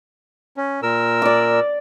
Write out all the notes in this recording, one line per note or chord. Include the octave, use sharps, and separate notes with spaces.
C#4
A#2 A#4 E6
D5 D6